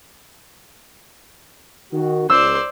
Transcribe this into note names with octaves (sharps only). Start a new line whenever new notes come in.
D#3 F#4
C#2 C5 D5 E6